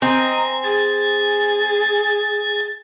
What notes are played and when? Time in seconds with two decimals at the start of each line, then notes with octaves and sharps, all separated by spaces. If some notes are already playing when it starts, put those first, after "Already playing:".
0.02 C4 D#5 G#5 A#5
0.64 G#4 A6